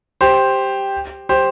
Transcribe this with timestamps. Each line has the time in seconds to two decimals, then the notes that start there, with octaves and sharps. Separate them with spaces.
0.21 G4 C5
1.29 G4 C5